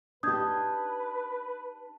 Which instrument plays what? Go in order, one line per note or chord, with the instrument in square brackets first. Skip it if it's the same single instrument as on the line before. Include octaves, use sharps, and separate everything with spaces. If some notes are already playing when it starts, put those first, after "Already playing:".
[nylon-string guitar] D4 D#4 G4 [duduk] B4 [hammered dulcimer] A5 [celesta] D#6 G6 G#6